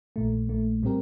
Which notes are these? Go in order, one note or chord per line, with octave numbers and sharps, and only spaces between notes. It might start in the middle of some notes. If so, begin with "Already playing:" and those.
A#1 A#2 A3
A#1 A#2 A3
A2 G3 C4 G4 A#4